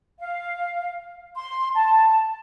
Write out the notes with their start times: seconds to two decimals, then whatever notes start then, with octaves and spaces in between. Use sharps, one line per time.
0.19 F5
1.36 C6
1.74 A5